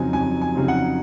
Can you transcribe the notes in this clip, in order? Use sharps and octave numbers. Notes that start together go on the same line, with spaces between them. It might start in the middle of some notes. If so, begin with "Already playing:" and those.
Already playing: F2 C#3 F#3 C4 D#4 G#5
F2 G#5
G#5
C#3 F#3 C4 D#4
F#5